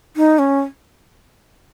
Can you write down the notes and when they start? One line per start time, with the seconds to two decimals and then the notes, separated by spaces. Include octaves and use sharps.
0.16 D#4
0.39 C#4